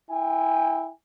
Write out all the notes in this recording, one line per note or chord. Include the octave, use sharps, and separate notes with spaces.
E4 G5 G#5